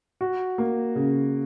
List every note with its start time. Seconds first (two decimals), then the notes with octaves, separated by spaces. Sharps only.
0.21 F#4
0.58 A#3
0.96 C#3